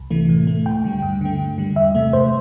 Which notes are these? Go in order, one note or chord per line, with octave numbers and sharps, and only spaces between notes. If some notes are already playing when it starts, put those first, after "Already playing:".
Already playing: C2
C3 E3 A3
A2
A3
D2 G5
D3 G3
G2
D3 A3
G2
D3 G3
E2 E5
C3 A3
G2 C5